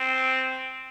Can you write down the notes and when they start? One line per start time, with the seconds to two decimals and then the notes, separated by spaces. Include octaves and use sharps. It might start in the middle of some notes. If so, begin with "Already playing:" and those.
Already playing: C4